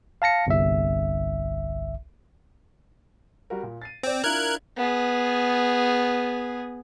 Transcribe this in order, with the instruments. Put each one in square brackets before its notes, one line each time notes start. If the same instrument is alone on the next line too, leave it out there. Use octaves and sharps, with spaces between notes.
[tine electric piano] F5 A5 A#6 C#7
G1 C2 E5
[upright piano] G3 F#4 A#4
A#2
A6 C7 D#7
[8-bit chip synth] C4 [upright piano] D5 G5
[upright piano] D4 E4 F4 [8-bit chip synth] A#4 F#6 G#6
[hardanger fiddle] B3 G#4